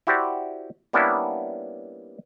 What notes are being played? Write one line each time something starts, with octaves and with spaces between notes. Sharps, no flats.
E4 F#4 G4 C5 D5
G3 A#3 B3 C#4 D4 E4